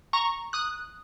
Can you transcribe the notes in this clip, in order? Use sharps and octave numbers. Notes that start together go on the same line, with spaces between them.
A#5 C#6
D#6 F#6